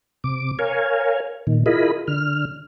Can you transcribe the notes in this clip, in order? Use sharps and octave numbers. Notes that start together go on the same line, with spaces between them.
C3 D6
A#4 C#5 F5 G#5
A#2 D#3
E4 F4 G#4 A#4 D#5 B5
D3 F6